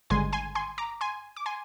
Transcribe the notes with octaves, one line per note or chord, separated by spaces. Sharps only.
G#1 G2 D3 G#3 G#5 C6
G#5 C6
G#5 C6
A#5 D6
G#5 C6
D6
G#5 C6